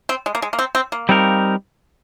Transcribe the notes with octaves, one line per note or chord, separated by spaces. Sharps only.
C4
G#3
A#3
G#3
A#3
C4
C4
A#3
G3 C4 D#4 A#4